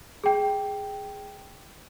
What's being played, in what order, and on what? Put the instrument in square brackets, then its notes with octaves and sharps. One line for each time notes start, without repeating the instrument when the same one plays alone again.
[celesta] G#4 G5